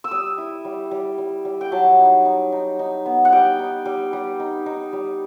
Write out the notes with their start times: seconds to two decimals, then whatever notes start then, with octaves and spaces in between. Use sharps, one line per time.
0.04 E6
0.11 G3 D#6
0.38 E4
0.65 G3
0.91 G3
1.18 G3
1.45 G3
1.61 G5
1.72 F#3 A5
1.99 D#4
2.25 D#4
2.52 D#4
2.79 D#4
3.06 B3
3.25 F#5
3.32 G3 G5
3.59 D#4
3.85 G3
4.13 G3
4.40 D#4
4.66 D#4
4.93 G3